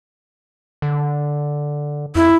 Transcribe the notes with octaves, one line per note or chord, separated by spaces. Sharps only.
D3
F2 E4